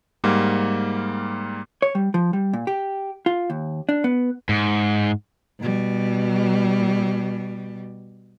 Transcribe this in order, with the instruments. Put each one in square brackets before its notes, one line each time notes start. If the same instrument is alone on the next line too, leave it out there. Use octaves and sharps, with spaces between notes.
[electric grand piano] G#2 G3 A#3
[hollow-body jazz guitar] C#5
G3
F3
G3
A#2
G4
F4
D#2
D4
B3
[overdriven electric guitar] G#2
[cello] B2 G3